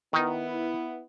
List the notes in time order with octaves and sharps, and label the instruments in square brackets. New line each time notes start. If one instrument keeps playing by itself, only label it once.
[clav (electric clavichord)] D#3 D#4 [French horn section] B3 E4